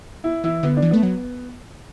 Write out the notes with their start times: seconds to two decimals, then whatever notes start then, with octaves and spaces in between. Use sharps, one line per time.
0.24 E4
0.44 E3 E4
0.63 D3 B3
0.77 D4
0.83 E3
0.91 A3 B3
1.03 F#3